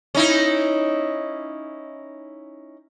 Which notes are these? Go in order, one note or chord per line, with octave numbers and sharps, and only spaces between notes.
C#4 D#4 E4